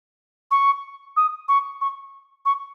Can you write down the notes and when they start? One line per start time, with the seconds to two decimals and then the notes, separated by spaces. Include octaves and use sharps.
0.51 C#6
1.16 D#6
1.48 C#6
1.81 C#6
2.45 C#6